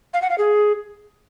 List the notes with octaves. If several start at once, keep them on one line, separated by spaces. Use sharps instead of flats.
F5
F#5
F5
G#4